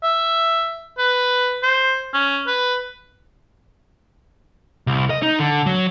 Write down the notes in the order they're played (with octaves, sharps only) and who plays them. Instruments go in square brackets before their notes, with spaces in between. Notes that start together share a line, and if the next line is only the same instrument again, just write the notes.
[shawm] E5
B4
C5
C#4
B4
[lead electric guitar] C2
D#5
D#4
D3
F#3